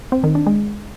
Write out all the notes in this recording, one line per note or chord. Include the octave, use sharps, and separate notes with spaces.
C4
D#3
D4
G#3